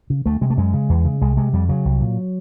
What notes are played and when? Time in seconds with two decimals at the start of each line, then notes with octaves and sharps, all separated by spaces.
0.10 C#3
0.26 D2 A3
0.41 C3 G#3
0.50 A3
0.57 F#2 G#3
0.74 C#3
0.89 E2
1.05 C#3
1.21 C2 G#3
1.37 C3 G#3
1.53 F2 G3
1.69 C#3 F#3
1.85 C2
2.01 A#2